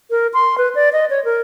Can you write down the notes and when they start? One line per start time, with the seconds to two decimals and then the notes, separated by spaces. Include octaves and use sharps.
0.11 A#4
0.34 C6
0.58 B4
0.75 D5
0.93 D#5
1.10 C#5
1.25 A#4